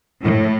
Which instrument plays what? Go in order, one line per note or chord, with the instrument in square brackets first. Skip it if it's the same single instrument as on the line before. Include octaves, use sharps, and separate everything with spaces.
[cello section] A2